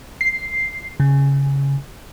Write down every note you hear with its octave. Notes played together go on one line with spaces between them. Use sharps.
C7
C#3